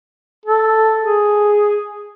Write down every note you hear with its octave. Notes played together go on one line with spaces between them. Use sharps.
A4
G#4